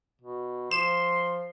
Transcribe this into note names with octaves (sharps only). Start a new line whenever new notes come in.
B2
F3 C6 E7